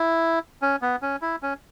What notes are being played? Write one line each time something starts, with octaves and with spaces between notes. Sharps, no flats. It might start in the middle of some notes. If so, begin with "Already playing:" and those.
Already playing: E4
C#4
B3
C#4
E4
C#4